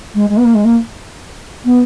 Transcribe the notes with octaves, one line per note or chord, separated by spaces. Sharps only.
G#3
G#3
B3
A#3
G#3
A#3
B3